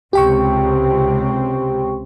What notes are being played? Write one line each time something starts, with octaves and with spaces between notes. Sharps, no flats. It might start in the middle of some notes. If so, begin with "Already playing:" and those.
C#2 C3 C4 G4 G5 C#6